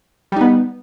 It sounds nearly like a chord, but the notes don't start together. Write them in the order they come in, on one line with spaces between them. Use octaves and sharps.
G3 D#4 B3